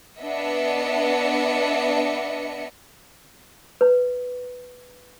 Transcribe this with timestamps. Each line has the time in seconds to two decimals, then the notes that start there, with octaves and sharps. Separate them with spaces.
0.20 B3 D4 D#5 E5 C#7
3.81 B4